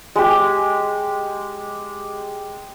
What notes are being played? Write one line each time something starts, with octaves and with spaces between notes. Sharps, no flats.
G#3 G4